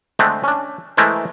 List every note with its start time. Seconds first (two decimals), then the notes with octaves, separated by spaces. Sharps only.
0.19 D3 G#3 A3 C4
0.44 C#4 D4
0.97 E3 G#3 A3 E4 A#4 C5